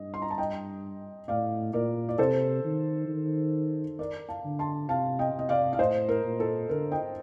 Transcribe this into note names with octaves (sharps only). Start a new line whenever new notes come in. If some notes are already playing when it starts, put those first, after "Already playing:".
Already playing: G2 D#5
C6
A#5
A5
D#5 G5
A2 D5 F5
A#2 A#4 D5
D5
C3 A4 C5
D#3
D#3
A#4 D5
F5 A5
D3
A5 C6
C3 F5 A5
D#5 G5
C3
D#5
D5 F5
F5
A2 C5 D#5
A#4
A#2
A4
D3 A#4
D#5 G5